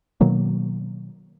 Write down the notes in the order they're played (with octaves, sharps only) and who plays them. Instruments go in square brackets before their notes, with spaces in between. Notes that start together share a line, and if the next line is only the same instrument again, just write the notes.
[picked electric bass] B2 D#3 F#3 A#3